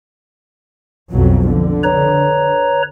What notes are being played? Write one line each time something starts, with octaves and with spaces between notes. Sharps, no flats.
B1 F2 F#3
D3
B4 C#5 A#5